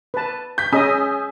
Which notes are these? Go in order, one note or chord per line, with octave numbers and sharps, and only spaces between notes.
B4 A5
G6 B6
C#4 G#4 D#5 G#5 D#6 E6